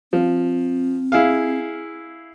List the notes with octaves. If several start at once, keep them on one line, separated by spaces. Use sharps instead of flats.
F3 C4
E4 G#4 F5